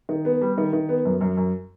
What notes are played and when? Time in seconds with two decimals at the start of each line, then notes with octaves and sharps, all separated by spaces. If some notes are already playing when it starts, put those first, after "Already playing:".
0.09 D#3
0.25 B3
0.41 G3
0.58 D#3
0.73 D#3
0.89 B3
1.05 F#2
1.21 F#2
1.37 F#2